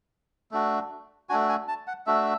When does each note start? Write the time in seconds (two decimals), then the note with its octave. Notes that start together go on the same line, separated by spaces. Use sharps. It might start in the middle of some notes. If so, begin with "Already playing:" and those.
0.51 A3 D4 F#4
1.29 A3 D4 F#4 G#5
1.49 G#5
1.68 A5
1.87 F#5
2.06 A3 D4 F#4 E5